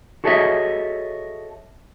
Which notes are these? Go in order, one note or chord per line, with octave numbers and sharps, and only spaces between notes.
F#4 G#4 A4 C#5 D#5 E5